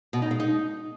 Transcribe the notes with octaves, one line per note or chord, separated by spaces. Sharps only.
B2
D#4
G#3
D#4